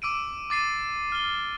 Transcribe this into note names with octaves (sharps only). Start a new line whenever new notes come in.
D6 E6 D7 D#7
D6 A6 C7 D#7
F6 G7